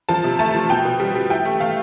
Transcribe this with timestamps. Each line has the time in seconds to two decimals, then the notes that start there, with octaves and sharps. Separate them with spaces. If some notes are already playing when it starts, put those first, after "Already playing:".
0.09 F3 A5
0.24 C3
0.39 A3 A5
0.55 F3
0.69 B2 G5
0.85 B2
1.00 G3
1.15 G3
1.30 E4 G5
1.46 A3
1.60 A3 F5